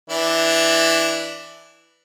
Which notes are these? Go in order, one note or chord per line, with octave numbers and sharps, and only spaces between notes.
E3 D4 E4